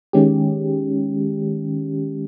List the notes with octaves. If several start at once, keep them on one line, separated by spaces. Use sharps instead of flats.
D#3 G#3 C#4 G4